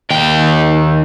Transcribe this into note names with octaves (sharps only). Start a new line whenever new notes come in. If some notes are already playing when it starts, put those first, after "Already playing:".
D#2 G5